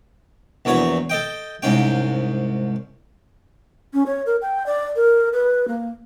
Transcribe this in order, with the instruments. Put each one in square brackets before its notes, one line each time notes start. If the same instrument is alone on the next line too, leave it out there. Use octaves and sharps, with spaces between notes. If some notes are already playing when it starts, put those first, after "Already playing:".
[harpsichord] A#1 E2 F#3 C#5
A4 D#5 G5
C2 G#2 C#4 G5
[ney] C#4
C#5
A#4
G5
D5
A#4
B4
A#3